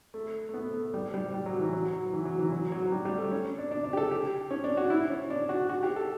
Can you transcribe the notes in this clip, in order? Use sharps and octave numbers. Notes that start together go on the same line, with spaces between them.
A3
A3
B3
A3
G3
G3
G3
F#3
E3
F#3
F#3
E3
F#3
E3
F#3
F#3
G3
G3
A3
C#4
D4
D4
D4
G4
A4
G4
C#4
D4
F#4
E4
C#4
D4
F#4
F#4
G4
A4